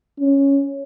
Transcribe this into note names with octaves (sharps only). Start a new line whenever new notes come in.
C#4